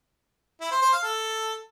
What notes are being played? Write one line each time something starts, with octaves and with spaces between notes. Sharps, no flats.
E4
C5
C5
F5
A4